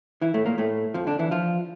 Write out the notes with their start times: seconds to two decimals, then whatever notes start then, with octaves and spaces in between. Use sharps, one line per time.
0.21 E3 E4
0.34 A2 A3
0.46 A#2 A#3
0.58 A2 A3
0.94 F2 F3
1.07 D3 D4
1.19 E3 E4
1.31 F3 F4